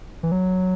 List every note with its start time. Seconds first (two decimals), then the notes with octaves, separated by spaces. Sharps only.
0.23 E3
0.32 F#3